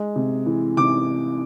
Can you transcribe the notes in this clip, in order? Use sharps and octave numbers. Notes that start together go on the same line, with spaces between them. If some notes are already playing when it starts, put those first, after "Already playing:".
Already playing: G#3
C3
E3
C3 D6